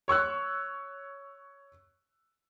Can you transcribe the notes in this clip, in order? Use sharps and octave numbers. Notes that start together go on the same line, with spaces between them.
C#5 C#6 E6 F#6